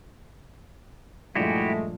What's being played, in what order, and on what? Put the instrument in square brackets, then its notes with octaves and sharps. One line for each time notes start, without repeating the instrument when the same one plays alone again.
[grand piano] G2 A#2 F3 [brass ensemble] G#3 A3 [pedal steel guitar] E4 F#4 G4